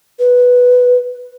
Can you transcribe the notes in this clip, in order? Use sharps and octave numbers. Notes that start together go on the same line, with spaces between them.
B4